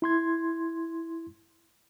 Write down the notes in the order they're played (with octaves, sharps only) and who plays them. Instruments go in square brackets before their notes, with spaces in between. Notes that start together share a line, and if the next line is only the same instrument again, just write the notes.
[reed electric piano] E4 C6 G#6